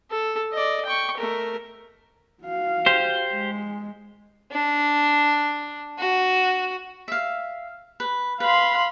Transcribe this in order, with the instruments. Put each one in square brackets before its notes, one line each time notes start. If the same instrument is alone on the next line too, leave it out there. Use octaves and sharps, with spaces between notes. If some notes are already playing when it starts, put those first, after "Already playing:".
[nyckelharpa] A4
D5 D#5
G5 C#6
A3 A#4
[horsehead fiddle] F#4 F5
[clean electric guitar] G4 C5
[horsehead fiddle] G#3
[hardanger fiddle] D4
F#4
[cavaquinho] E5 F5
B4
[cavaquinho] B4 [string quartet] F5 B5 C6